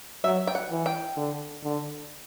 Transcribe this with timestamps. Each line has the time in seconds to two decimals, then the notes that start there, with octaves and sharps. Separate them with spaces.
0.24 F#3 E5
0.47 G5
0.55 F#5
0.70 E3
0.86 G5
1.17 D3
1.63 D3